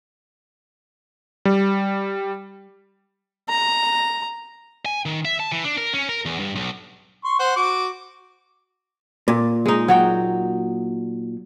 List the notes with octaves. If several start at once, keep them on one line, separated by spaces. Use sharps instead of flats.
G3
A#5
G#5
D#3
E5
A5
E3
D4
A#4
C#4
A#4
E2
G2
B1
C6 C#6
C5 F#5
F#4 D6
A#2
G#3 D#4
F#3 F#4 G5